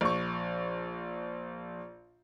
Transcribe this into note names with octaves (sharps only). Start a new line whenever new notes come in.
A#1 C#6